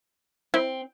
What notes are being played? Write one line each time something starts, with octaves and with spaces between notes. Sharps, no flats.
C4 E4